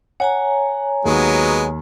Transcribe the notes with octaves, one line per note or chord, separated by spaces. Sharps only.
C#5 F#5 G#5 A#5
D#2 F#3 G#3 B3